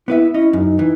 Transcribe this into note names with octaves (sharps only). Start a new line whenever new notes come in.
B3 E4 B4 E5
C#4 E4 D#5
F#2 D#4
E3